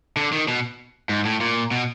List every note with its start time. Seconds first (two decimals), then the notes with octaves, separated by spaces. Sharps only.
0.17 D3
0.32 D#3
0.48 B2
1.09 G#2
1.25 A2
1.41 A#2
1.71 B2